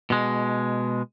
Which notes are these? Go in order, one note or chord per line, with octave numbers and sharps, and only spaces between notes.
B2 G#3